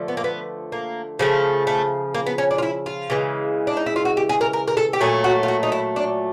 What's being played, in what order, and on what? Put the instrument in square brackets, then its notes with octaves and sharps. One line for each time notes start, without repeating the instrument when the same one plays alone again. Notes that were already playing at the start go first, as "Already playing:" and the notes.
Already playing: [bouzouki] D3 F3 A3
B3
A#3
B3
A#3
C#3 F3 A3
A3
A#3
B3
C#4
D4
F4
E4
F4
C#3 E3 G#3
D4
D#4
E4
F4
F#4
G4
G#4
A#4
A#4
A#4
A4
G4
A#2 F#3 A3 G#4
F#4
F4
F#4
D#4
E4
D4